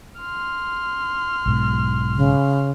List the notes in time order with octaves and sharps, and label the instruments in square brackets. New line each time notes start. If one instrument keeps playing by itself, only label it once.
[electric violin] C6 F6
[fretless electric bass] B1 G#2 B2
[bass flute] C#3